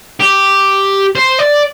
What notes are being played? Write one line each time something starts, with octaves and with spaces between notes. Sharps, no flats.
G4
C5
D5